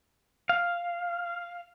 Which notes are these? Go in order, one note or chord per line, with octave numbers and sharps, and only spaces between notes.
F5